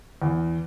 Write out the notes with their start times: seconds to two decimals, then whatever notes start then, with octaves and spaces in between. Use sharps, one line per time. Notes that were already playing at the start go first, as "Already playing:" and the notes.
0.22 E2